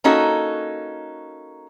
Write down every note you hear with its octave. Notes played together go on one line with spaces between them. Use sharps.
A#3 C#4 D#4 F#4 A4